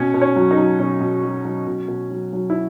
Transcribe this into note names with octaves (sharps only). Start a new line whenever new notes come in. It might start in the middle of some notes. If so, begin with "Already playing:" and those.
Already playing: B2 C#4 C#5
B2
C#4 C#5
F#3
D#4
F#3
B2 C#4
B2
F#3
F#3
B2
B2
F#3
F#3
E4